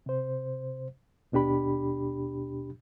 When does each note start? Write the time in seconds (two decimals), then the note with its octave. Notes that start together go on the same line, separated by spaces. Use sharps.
0.06 C3 C5
1.32 D#2 B2 D4 G4 B5